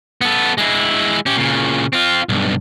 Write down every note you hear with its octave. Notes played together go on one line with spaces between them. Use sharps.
B3 A4
G#3 E4
C#4 G4
A#2 C#3
C4 F4
B1 G2